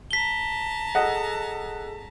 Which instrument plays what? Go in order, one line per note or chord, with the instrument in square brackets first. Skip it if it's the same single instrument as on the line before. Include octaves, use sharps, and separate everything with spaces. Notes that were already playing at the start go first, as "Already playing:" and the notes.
[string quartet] A5 A#5 [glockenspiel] B6 G7
[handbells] G#4 A4 [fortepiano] D#5 F#5